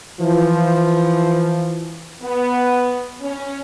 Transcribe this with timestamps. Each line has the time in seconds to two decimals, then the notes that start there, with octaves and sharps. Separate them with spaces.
0.20 E3 F3
2.22 B3
3.22 C#4